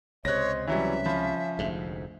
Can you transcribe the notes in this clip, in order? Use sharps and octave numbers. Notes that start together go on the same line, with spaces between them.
C#2 C3 C5 C#5 D#5 F#6 A#6
E3 F#3 G3 C#4 E5
F3 B5
F1 D2 G#2